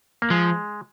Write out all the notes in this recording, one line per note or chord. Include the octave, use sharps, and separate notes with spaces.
A#3
F3 G#3